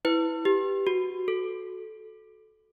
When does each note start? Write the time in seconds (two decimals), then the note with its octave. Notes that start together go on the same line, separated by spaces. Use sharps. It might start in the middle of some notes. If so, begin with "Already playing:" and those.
0.05 E4 B4
0.45 G4
0.87 F#4
1.28 A4